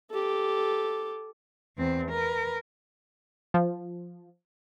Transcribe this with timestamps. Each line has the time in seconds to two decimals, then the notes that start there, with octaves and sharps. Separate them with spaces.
0.11 G4 A4
1.77 E2 C4
2.11 A#4 B4
3.54 F3